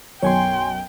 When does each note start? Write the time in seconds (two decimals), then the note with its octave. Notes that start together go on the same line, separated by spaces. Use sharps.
0.23 B1 F#2 C#5 G5 G#5 C6